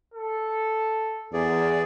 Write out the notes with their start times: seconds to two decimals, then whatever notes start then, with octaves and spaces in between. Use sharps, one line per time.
0.14 A4
1.33 E2 G#4 D5